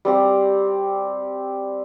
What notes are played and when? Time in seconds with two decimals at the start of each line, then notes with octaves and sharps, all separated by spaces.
0.05 G3 C4 G4